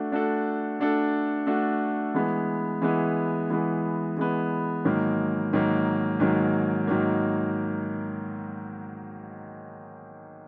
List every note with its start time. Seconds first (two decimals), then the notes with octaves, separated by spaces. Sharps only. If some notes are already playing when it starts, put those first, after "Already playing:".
Already playing: A3 D4 F#4 A4
0.12 A3 D4 F#4 A4
0.80 A3 D4 F#4 A4
1.47 A3 D4 F#4 A4
2.14 E3 G#3 B3
2.82 E3 G#3 B3
3.50 E3 G#3 B3
4.17 E3 G#3 B3
4.85 G#2 D#3 F#3 A#3
5.53 G#2 D#3 F#3 A#3
6.20 G#2 D#3 F#3 A#3
6.87 G#2 D#3 F#3 A#3